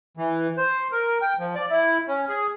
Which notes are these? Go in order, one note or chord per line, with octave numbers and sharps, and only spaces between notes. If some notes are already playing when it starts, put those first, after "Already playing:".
E3
C5
A#4
G5
F3
D5
E4
C#4
G#4